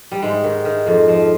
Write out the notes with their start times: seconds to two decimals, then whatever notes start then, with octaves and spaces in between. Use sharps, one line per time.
0.11 G3
0.22 G#2 G#3
0.44 D#3
0.65 D#3
0.86 F2
1.08 F3